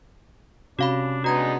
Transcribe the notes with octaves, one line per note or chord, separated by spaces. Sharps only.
C3 C#4 D4 F#4 F5 B5
G#3 B3 D4 D#4 F#4 A#5 G#6